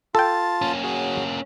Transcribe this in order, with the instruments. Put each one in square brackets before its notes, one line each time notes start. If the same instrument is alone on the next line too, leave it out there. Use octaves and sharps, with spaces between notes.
[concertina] F4 A5 [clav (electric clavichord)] A4 G5
[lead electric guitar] A#3 C#4
[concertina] F#4 G#4 C#5